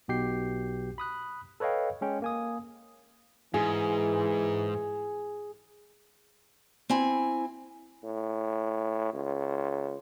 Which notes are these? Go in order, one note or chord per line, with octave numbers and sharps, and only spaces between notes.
B1 B2 G4 G6 C7
B5 D#6 F#6
A4 B4 C#5 D#5 F5 G5
G#3 C#4 G5
A#3 G#5 D#6
G#2 E3 G#4
C4 E4 G#5
A2
C#2